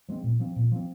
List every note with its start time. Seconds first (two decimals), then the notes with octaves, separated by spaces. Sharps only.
0.09 F3 G#3 C4
0.24 A#2
0.40 F3 C4
0.56 A#2
0.72 F3 C4